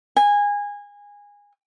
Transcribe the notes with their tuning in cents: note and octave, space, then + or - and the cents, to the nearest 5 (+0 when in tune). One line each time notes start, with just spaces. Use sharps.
G#5 -20